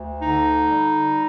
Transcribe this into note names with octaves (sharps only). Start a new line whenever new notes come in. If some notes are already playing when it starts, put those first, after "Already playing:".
Already playing: D2
D3 D#4
G3